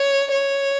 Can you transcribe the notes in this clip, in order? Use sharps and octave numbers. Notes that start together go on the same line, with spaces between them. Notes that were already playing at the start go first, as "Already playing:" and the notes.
Already playing: C#5
C#5